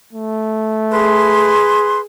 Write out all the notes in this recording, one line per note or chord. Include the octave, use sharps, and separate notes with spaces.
A3
G#4 B4 C6